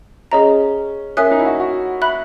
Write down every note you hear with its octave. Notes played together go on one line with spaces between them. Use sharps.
C#4 G#4 D#5 A#5
C#4 A#4 E5 G#5 D#6 F#6
D#4
E4
F#4
F#4
E5 B5 F#6